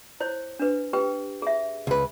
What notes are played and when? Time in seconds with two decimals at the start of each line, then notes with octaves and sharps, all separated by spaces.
0.20 E4 C5 C#5
0.59 D4 B4
0.93 G4 B4 G5
1.42 G#4 E5
1.87 C#2 B4